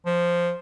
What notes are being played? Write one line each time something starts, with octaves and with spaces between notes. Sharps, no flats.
F3